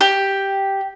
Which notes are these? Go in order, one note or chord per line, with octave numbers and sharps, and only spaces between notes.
G4